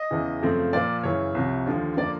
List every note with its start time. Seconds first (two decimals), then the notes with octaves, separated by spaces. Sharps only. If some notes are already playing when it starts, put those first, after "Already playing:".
Already playing: D#5
0.11 E2 C#3 E3
0.42 F#2 C#3 F3 A3 C4
0.73 A#2 F3 A#3 D5
1.03 F#2 C#3 E3 C#5
1.35 C2 C3 F3
1.66 D#2 D3 F3
1.97 D3 F3 A#3 D5